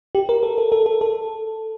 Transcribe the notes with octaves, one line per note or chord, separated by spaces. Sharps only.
G4
A#4
A4
A4
A4
A4
A4